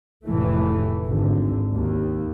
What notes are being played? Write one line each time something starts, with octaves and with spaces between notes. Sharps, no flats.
F1 A2 E3 A3
G#1 D3
D#2